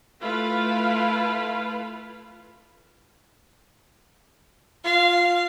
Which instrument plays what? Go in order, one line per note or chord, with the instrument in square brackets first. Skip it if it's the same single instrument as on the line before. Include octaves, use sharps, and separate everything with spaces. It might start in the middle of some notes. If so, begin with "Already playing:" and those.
[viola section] A3 E4 F4 B4 F5 B5
[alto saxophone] F4 [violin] F5